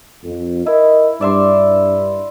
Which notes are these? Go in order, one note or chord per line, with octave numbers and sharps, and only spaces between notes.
F2
E4 A#4 D#5
G2 D5 E5 C6